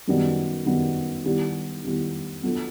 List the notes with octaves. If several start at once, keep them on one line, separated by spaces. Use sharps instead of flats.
F#2 D#3 G3 B3
F#2 D#3 G3 B3
D#3 G3 B3 E4 G4
D#3 G3 B3 E4 G4
F#3 B3 D4 F4 A4